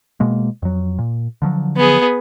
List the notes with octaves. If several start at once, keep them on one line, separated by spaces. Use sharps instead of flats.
B2 G#3 A#3
F2 F#3
A#2
D3 F3 F#3
B3 G#4